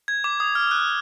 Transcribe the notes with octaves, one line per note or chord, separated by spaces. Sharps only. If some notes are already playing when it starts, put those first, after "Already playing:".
G#6
D6
D#6
F6
F#6